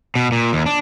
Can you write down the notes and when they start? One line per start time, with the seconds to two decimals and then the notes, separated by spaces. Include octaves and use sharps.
0.15 B2
0.32 A#2
0.53 D#2
0.66 D4